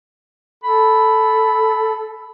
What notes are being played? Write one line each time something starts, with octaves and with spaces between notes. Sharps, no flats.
A4 B5